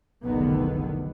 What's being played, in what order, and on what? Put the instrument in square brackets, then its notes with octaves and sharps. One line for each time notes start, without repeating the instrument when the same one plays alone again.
[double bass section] F1 B1 E2 D3 D#3 B3